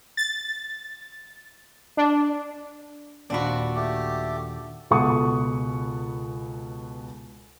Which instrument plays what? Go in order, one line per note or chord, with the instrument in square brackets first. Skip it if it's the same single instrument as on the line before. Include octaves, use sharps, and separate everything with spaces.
[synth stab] A6
D4
[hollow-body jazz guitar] D#2 A#2 B5 [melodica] C4 [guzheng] D4 F#4
[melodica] A3 G4
[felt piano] C#2 B2 A4 F#5 C#6 D#6